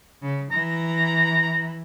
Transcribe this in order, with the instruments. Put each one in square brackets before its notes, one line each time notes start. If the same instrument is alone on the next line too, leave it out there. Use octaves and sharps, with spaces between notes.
[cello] C#3
[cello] E3 [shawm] A#5